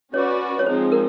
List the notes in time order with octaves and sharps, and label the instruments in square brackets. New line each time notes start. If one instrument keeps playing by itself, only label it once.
[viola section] C#4 F#4 B4 D5 [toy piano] C#5
[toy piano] C#5
[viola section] F3 G#3 C4 D#4 [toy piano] C5
[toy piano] A#4